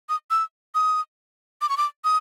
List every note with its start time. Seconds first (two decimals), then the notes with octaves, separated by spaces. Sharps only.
0.09 D#6
0.31 E6
0.75 D#6
1.61 D6
1.69 C#6
1.77 D6
2.04 D#6